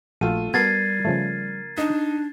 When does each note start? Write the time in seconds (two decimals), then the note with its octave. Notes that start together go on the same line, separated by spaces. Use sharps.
0.21 A#1 A3 F4 F#4 G5 D#7
0.54 G3 B3 F#4 A4 A#4 G#6 A6 C7
1.05 C#3 F3 A3
1.78 D4 D#4